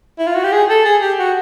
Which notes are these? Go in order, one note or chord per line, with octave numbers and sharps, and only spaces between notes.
E4
F4
F#4
G4
G#4
A4
G#4
G4
F#4